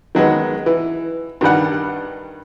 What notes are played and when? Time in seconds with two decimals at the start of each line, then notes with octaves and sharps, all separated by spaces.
0.15 D#3 F#3 G#3 B3
0.66 E3
1.41 G2 D#3 G3 F#5